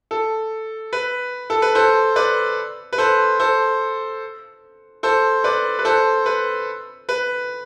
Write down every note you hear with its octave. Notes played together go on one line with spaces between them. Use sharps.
A4
B4
A4
B4
A4 C5
B4 D5
B4
A4 C5
A4 C5
A4 C5
B4 D5
B4
A4 C5
B4
B4